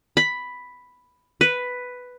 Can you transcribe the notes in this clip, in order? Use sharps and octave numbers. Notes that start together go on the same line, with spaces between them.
B5
B4